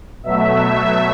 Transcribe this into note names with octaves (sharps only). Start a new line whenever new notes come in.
B2 F#3 A3 E5
E5